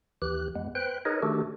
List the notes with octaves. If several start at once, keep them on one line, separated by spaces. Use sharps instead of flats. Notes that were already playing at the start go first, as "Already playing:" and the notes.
D#2 E3 G4 F#6
F2 G#3 B3
B4 C5 G5 F#6
D#4 G#4 A#4 B4 C#5 D#5
D#3 A3 D4 F#4 G4 A4